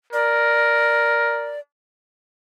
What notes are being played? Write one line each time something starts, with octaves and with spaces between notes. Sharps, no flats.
A#4 D5